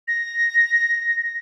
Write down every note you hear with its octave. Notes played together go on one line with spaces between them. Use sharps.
A#6